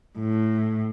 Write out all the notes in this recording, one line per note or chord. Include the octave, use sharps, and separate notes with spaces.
A2